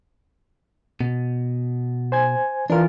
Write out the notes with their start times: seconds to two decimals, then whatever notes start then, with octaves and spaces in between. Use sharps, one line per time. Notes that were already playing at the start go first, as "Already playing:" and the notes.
1.01 B2
2.12 C5 G#5 G#6
2.70 E3 D4 F4 A#4